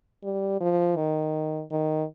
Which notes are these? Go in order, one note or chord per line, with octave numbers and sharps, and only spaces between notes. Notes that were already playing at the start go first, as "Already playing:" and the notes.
G3
F3
D#3
D#3